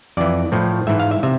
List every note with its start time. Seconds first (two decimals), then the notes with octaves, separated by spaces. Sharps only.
0.17 F2 E3 D5
0.52 A2 F3
0.87 G#2 E3 E5
1.00 F5
1.11 E5
1.23 C3 E5